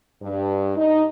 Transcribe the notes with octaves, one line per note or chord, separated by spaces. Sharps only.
G2
D#4